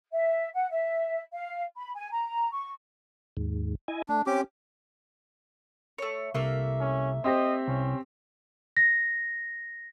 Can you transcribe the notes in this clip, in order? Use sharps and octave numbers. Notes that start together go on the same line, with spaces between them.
E5
F#5
E5
F5
B5
G#5
A#5
C#6
D#2 G#2
E4 D#5 G#5
A3 D4
C4 C#4 G4 D6
A3 C#5
C2 A3 A#3 E5
C#4
C4 G4 C5 D#5
C2 C#4
A#6